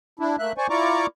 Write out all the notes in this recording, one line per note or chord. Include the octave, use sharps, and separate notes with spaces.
D4 E4
A3 A#3 E5 F#6
C5 D5 G#5 C#6
E4 F4 D5 A#5 C#6 D6